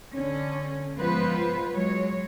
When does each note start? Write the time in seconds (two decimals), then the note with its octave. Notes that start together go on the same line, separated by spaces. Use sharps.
0.13 D3 C#4
0.96 F3 G#3 B3 F4 B4 C5
1.71 F#3 G#3 C#5